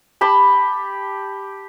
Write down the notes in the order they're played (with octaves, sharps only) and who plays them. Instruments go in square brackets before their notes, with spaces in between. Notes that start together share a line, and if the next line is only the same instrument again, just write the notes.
[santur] G4 A5 B5